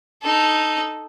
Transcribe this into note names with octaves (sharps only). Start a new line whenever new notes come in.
D#4 A4